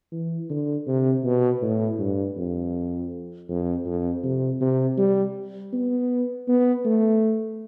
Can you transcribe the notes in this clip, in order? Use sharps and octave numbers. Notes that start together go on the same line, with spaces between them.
E3
D3
C3
B2
A2
G2
F2
F2
F2
C3
C3
G3
B3
B3
A3